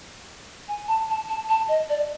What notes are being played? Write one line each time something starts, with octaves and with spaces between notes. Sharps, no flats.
G#5
A5
A5
A5
A5
D#5
D5